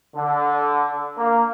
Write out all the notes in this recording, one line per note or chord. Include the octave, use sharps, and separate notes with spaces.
D3
A#3